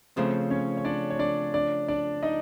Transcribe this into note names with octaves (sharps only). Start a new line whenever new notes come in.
C#3 F3 A3 C4 C5
C#4 C#5
C#5
D4 D5
C#5
D4 D5
D4 D5
D4 D5
D#4 D#5